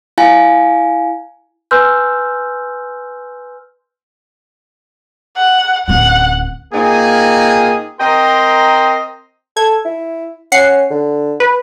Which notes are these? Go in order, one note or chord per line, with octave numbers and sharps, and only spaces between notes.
E4 F5 G#5
B4 G#5 C6 E6 F6 G6
F#5
D1 C#4 F#5
A#2 A#3 C4 D#4 G#4
C4 A#4 D#5 G5 A#5 C6
A4 G#6
E4
C#4 F#5 C7 C#7
D3
B4